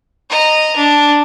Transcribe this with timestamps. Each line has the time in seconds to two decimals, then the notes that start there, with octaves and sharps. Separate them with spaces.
0.29 D#5 A#5
0.76 D4